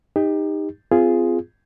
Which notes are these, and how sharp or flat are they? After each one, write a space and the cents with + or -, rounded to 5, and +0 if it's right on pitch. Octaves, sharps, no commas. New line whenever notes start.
D#4 +0 G4 +30
C4 -30 F4 -10 G#4 +0